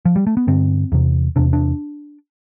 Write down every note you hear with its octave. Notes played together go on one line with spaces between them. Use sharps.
F3
G3
A3
B3
G2 D3 C4
E2 C3
E2 C3 D4
D4